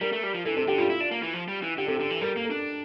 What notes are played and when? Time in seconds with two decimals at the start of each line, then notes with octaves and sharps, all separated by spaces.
0.01 G3 A#4
0.12 A3
0.23 G3
0.34 F3
0.45 E3 A4
0.56 C3 A4
0.67 D3 G4
0.78 G3 F4
0.90 E4
1.00 D4
1.11 A#3
1.22 E3
1.33 F3
1.48 G3
1.62 E3
1.78 D3 G4
1.87 C3 A4
1.96 D3 G4
2.10 E3
2.21 G3 A#4
2.36 A#3
2.44 A4
2.51 D4